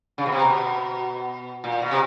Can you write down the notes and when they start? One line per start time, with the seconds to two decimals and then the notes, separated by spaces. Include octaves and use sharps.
0.18 C#3
0.26 B2
0.32 C3
0.45 B2
1.64 A#2
1.82 B2
1.91 C3